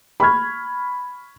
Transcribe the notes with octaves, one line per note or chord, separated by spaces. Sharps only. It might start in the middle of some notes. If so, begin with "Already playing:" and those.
B5 C#6 F6 G#6